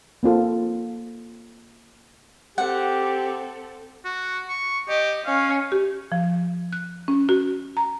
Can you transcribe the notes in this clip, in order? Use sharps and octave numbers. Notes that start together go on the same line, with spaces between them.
A#3 C4 F4 A4
C4 G4 A4 F#5
F#4
C#6
G4 D#5
C#4 F5
G4
F3
F#6
C#4
F#4
A#5